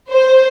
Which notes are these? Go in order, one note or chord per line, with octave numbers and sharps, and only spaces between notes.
C5